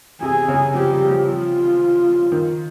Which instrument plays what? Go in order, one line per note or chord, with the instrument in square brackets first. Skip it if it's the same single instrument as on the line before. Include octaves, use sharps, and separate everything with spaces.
[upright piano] C3 [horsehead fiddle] G#4
[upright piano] C#3
[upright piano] F3 [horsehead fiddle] G4
[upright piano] G3
F3
[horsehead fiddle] F4
[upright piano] D#3